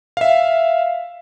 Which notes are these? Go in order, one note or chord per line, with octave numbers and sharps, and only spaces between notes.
E5 F5